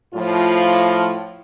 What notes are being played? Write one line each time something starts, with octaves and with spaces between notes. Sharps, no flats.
A2 F3 F4